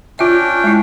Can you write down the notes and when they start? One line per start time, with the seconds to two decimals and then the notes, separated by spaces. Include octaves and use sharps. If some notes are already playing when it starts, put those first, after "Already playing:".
0.19 C#4 D4 F4 E5 G5
0.64 G#3 E4